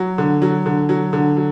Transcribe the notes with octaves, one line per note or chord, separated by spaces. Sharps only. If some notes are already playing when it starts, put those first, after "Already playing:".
Already playing: F#3
D3
F#3
D3
F#3
D3
F#3